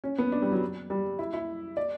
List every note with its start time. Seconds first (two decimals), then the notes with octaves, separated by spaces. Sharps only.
0.04 C#4
0.18 B3
0.32 D4
0.42 G3
0.52 F#3
0.90 G3
1.19 E4
1.33 E4
1.77 D5